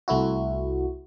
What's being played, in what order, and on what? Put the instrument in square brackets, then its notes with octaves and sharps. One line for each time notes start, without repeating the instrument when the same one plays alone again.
[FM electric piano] C2 A3 E4 F#4